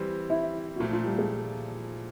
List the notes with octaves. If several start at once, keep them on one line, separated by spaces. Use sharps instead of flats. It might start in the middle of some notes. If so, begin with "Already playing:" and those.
Already playing: E3 G3 C4
E4
F#4
A#2 F3 A3 F4
F4
G3 G4
G#3 G#4